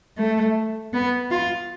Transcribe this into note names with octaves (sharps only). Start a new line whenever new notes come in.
A3
B3
F4